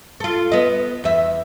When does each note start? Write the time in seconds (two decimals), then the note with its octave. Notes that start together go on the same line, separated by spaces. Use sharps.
0.20 F4 A4
0.52 B3 D#5
1.04 E2 E5